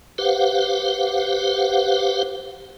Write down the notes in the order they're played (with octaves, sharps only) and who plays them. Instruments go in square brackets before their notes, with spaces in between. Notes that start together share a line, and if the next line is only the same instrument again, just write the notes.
[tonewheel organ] G4 B4 C5 F5 F#5